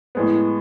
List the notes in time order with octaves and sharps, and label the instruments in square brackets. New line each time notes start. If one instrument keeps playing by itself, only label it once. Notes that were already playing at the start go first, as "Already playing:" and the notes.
[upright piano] A2 G#3 B3